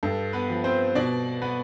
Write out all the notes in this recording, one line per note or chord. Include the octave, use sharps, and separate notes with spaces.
G2 A4
B3 B4
F3
C4 C5
B2 D4 D5
B3 B4